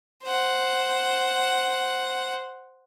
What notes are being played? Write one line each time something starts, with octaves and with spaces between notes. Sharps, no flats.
C5 F#5